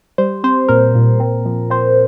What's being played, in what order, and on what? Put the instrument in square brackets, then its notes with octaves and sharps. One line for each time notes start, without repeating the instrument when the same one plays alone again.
[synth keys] G3 C5
C4 C5
A#2 A#4
A#2
C4
F3
C4 C5